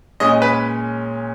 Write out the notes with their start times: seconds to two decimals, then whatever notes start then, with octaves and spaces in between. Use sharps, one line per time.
0.20 A#2 G#3 C#4 D#5
0.42 B4